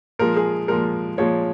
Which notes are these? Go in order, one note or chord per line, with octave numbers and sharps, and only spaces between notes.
A#2 F3 G#3 A#4
G#4
A#2 F3 G#3 A#4
A#2 F3 G#3 C#5